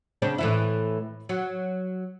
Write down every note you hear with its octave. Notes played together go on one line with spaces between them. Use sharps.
C#3 C4 D4
A2 E3 E4
F#3